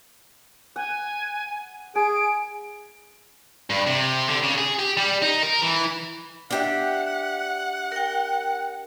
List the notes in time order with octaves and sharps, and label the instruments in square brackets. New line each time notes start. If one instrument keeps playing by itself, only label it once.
[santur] F#5 [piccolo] G#5
[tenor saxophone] G#4 [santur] G#5 [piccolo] D7
[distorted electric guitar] G2
C3
D3
C#3
G#4
G4
G3
D#4
A#4
E3
[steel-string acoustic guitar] D4 G4 E5 [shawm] F#5
[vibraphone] A#4 G5